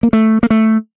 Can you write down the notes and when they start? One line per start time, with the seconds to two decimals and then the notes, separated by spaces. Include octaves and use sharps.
0.03 A#3
0.13 A3
0.43 A#3
0.50 A3